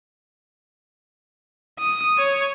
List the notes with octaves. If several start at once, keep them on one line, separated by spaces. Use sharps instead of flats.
D#6
C#5